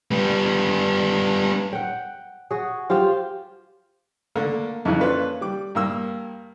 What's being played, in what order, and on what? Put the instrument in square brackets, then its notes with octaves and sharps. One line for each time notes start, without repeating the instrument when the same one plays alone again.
[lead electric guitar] G3 B3
[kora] F#5 G5
F#4 G#4
F4 G4 C5 F5
[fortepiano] D3 A3 A#3 A4 A#4
F2 C#3 E3 F#6
A#3 C#4 D4 F4 A4 B4
G3 D6
G2 A#3 E6